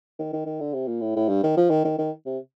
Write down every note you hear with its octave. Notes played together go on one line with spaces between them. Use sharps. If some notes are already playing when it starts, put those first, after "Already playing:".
D#3
D#3
D#3
D3
C3
A#2
A2
A2
G2
D#3
F3
D#3
D#3
D#3
C3